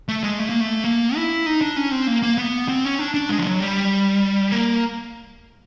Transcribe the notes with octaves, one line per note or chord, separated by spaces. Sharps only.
A3
G#3
A3
A#3
A3
A#3
E4
D#4
D4
C#4
C4
A#3
A#3
B3
C4
C#4
D4
D4
G#3
F3
F#3
G3
A#3